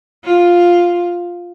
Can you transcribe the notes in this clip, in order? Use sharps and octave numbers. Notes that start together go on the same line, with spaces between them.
F4